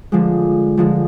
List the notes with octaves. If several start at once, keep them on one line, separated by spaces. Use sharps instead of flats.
D3 F3 G#3
D3 F3 G#3